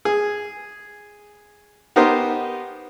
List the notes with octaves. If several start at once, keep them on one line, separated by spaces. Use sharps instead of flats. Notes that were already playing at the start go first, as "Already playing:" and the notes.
G#4
B3 D#4 G4 A#4 C5